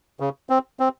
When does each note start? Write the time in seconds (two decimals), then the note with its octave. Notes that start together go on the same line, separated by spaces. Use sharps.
0.20 C#3
0.50 C4
0.80 C4